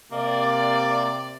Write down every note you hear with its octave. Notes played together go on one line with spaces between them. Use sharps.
C3 A#3 D5